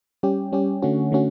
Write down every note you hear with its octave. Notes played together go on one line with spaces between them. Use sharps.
G3 C#4 G4
G3 C#4 G4
D3 A3 C#4 F#4
D3 A3 C#4 F#4